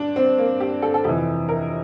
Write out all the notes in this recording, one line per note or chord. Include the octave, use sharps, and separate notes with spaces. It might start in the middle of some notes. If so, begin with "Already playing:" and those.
Already playing: G2 D4
C4
A#3
G4
A4
A4
F2 C3 E3 G4
A#4